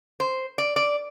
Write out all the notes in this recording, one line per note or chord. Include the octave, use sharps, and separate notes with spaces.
C5
D5
D5